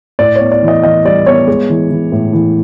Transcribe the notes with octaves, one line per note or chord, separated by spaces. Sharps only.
A2 D5
B3 C#5
D5
E3
D#5
E3 D#5
G3 D5
B3 C#5
G#3
E3
E3
A2
E3